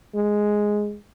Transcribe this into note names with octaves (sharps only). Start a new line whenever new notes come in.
G#3